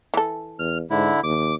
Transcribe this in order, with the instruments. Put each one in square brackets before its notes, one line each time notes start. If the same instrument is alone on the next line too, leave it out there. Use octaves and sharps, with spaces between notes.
[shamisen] E3 A4
[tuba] E2 [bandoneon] F6
[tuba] G#2 [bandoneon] D3 E4
[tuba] D#2 [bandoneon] D6